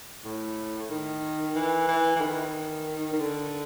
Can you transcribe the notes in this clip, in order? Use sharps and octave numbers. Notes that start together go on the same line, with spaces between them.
A2
D#3
E3
E3
E3
D#3
D#3
D3